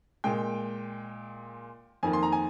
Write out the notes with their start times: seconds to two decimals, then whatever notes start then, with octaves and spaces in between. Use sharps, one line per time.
0.24 A#2 G#3 G5
2.03 F2 D#3 A#3 G#5
2.13 C6
2.23 A#5
2.32 G#5